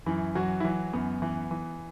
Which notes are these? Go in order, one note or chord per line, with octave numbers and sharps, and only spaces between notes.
F#2 E3 E4
E3 F#3 F#4
E4
E3 F#3 F#4
F#2 B3
E3
E3